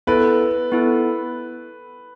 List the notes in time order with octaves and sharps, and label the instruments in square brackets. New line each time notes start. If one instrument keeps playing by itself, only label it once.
[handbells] B3 E4 A4 [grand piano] B4
[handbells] B3 E4 A4